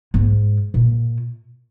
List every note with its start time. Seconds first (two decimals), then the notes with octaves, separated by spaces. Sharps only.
0.14 G#2
0.74 A#2